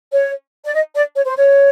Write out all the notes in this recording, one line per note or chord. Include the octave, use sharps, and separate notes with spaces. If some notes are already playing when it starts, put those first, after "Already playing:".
C#5
D5
D#5
D5
C#5
C5
C#5